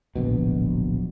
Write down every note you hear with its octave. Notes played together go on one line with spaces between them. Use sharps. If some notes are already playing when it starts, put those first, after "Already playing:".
D1 A#1 B2